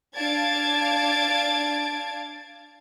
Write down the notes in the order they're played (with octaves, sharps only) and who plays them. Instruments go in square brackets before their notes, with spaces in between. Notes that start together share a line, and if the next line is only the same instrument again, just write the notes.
[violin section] D4 F5 A5 G#6 A6 D7